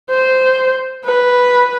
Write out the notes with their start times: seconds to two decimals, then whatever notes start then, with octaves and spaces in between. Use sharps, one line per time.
0.10 C5
1.05 B4